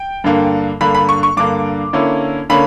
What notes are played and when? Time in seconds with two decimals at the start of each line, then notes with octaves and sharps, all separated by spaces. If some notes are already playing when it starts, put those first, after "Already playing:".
Already playing: G5
0.24 G2 D3 A#3
0.81 G2 D3 A#3 B5
0.95 B5
1.09 C#6
1.23 C#6
1.37 G2 D3 A#3 D6
1.93 D3 A#3 C#4 E4
2.50 D3 A#3 C#4 B5